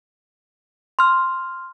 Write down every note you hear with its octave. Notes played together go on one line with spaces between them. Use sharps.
C6 F6